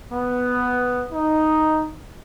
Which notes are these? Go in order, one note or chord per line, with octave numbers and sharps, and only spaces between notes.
B3
D#4